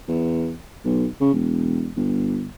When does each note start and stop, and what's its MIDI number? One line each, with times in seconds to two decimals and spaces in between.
0.09 0.54 40
0.85 1.07 35
1.21 1.32 49
1.34 1.90 28
1.96 2.49 31